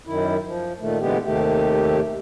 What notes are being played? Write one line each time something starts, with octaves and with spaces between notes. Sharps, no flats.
F#2 D#3 E4
F3
A#2 D#3 A3
A#2 D3 E3 G#3 B3 G4
D#2 C3 D#3 A3 G4